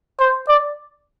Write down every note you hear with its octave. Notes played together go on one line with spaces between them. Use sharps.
C5
D5